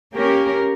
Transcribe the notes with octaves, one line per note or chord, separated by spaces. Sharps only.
A#3 C#4 G4 A#4